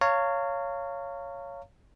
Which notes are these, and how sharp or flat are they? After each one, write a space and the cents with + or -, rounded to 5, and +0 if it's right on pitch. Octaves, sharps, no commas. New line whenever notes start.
C#5 +5 F5 -10 A#5 -40